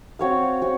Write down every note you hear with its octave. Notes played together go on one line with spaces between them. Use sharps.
C4 F#4 C#5 F5
C4 F#4 C#5